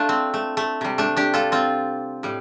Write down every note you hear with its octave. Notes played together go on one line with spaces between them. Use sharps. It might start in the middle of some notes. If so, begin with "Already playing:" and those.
Already playing: A3 D4 F4
C4
A3
A3
C3 G3
A3 D4
D4 G4
F4 A4
C4 F4
A2 G3